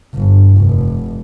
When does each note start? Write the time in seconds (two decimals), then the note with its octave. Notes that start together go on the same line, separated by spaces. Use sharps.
0.15 G1
0.59 F1